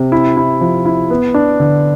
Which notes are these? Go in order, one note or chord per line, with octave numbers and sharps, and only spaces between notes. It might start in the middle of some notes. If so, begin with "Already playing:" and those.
Already playing: C3
E4
E4
F3
E4
B3
D4
D3